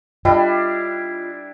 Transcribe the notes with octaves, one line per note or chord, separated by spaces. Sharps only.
G3 D4 E4 F4 D#5 G5